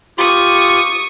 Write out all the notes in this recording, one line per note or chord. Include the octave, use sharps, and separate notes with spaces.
F4 G4 C#6 D#6